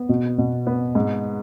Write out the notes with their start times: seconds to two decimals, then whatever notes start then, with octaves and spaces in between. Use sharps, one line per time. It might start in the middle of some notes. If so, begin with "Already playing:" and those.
Already playing: B3
0.09 B2
0.38 B2
0.67 B3
0.95 G#2